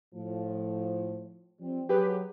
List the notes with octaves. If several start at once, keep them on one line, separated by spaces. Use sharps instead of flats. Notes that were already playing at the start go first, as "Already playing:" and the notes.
A2 F3
F3 G3 C4
F#3 G4 G#4 B4